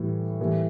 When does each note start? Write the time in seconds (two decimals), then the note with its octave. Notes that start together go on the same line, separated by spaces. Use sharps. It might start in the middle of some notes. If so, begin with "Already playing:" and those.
Already playing: A2 E3 G3
0.40 A2 E3 G3